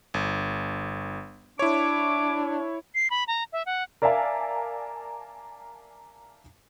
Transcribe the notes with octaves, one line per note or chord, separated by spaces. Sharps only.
G1
D4 E4 C#5 D6
C7
B5
A#5
E5
F#5
A#4 D5 E5 F5 G#5 A5